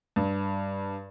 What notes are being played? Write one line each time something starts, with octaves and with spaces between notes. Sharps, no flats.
G2